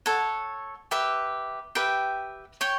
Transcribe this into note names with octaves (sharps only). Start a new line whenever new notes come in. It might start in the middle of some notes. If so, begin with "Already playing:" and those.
A4 C#5 F#5
G4 B4 E5
G4 B4 E5 G5
C#5 G5 C#6